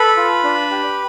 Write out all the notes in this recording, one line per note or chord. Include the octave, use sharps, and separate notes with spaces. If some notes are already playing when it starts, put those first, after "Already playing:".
Already playing: A4 B4 B5
F4
D4
G4